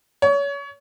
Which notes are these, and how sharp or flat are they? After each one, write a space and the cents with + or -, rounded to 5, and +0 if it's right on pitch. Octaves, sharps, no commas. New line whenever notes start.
C#5 +30